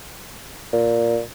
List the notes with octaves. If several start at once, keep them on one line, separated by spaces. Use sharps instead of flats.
A#2